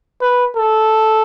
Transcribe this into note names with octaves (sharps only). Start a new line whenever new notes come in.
B4
A4